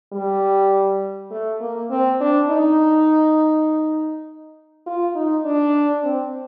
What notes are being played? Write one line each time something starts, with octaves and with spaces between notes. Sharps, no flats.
G3
A3
A#3
C4
D4
D#4
F4
D#4
D4
C4